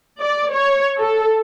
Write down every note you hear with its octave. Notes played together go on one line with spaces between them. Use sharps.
D5
C#5
A4